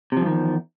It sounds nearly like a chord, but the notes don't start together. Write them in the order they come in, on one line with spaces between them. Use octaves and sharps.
C3 F3 G2 D#3 E2